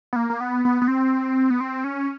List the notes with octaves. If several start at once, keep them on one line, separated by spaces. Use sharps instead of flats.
B3
A#3
A#3
B3
B3
B3
C4
B3
C4
C#4